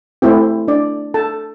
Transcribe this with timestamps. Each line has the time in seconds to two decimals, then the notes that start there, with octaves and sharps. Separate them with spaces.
0.22 A3 C4 E4 G4 C5
0.68 D4 D5
1.14 A4 A5